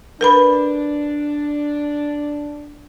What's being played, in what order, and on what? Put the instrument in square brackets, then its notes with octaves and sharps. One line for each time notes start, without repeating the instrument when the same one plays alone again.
[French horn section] D4 [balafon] A#4 B4 B5